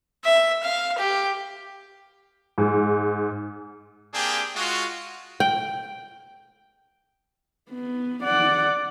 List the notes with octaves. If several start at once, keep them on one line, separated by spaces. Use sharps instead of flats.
E5
F5
G4
G#2
A#3 C4 D4 G4 G#4 G5
G#3 F4 F#4
G5
B3
D5 F#5